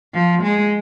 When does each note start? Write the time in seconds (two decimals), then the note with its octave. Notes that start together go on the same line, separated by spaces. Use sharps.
0.14 F3
0.43 G#3